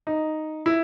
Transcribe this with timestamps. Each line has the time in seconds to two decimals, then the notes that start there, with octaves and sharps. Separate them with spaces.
0.07 D#4
0.66 E4